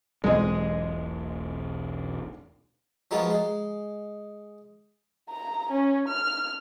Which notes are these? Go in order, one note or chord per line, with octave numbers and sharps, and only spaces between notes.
E1 B1 E2 G#3 C4 D#5
F3 F#3 G#3 A#3 B3 F4
G#3
A#5
C#4
F6